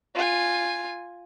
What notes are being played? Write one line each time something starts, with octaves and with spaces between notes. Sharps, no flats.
F4 G#5